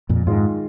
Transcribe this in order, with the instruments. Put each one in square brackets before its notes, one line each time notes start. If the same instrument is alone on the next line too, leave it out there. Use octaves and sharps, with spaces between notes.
[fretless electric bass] F2 A#2
[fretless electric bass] G#2 [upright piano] D#3 G#3 F4